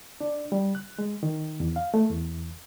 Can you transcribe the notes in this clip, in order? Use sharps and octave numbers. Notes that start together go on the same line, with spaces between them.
D4
G3
F#6
G#3
D#3
E2
F5
A3
E2